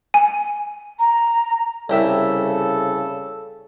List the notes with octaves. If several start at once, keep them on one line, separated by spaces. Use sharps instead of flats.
G#5
A#5
C2 C#3 G4 A4 E5